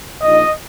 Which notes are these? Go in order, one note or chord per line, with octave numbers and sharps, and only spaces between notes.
A#1 A#2 A#3 D#4 D#5